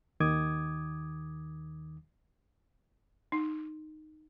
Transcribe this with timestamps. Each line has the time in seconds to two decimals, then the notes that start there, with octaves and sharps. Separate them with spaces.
0.20 D#2 D#3 D6 D#6 G#6
3.32 D#4